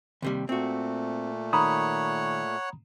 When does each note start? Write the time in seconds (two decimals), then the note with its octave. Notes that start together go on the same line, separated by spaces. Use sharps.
0.22 D#2 C3 G3
0.49 A#2 A3 C4 F#4
1.53 D#3 C#5 F#5 A#5 B5 D#6